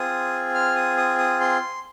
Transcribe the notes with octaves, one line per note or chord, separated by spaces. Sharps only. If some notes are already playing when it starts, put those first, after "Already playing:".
Already playing: C4 F4 G#4 D#6
F6
D#6
D#6
D#6
C6